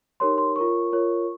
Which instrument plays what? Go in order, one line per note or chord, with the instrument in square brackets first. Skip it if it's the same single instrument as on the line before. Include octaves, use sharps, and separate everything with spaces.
[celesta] D#4 G4 A#4 C#5 C6
C6
F4 A#4 C#5 C#6
F4 A#4 C#5